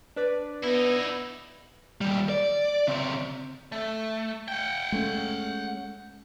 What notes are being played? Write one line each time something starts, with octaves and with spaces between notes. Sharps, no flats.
D4 B4 D5
B3 D#4 E4
D#2 G3
D5
C#3 C4
A3
F#5 G5
G#3 A3 C#4